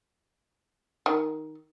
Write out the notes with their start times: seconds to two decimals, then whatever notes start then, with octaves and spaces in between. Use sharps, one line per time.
1.06 D#3